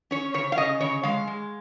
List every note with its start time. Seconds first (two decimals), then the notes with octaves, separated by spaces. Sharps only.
0.11 C#4 C#5
0.34 C#3 C#5
0.52 F5
0.58 C#3 D#5
0.80 C#3 C#5
1.03 G#3 F5
1.27 G#3